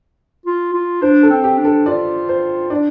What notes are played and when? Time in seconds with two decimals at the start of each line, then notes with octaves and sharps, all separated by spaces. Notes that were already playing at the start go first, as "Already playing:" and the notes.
0.46 F4
0.73 F4
1.02 D4 C5
1.23 A4
1.30 C4
1.44 G4
1.58 D4
1.65 A4
1.86 F4 D5
2.29 C5
2.70 D4 D5